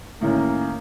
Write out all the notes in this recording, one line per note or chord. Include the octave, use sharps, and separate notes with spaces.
A2 D#3 A#3 C#4